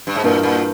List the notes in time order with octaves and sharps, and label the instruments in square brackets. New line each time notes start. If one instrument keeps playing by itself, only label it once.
[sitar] G2
G#2
[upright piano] G2 E3 A#3 [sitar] A#2
[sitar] A#2